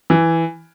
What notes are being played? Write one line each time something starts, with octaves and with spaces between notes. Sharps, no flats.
E3